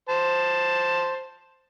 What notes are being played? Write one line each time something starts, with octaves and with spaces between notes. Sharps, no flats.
C5 A5